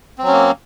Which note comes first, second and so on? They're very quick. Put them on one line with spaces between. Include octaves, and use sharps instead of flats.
C4 F#3 C#4 A#3